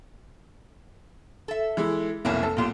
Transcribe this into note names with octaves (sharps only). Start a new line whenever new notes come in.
A4 E5
E3 G#3 E4
F1 B1 E2 A#3 C#4 E4
A4
B1 A#2 A#3 F4 G4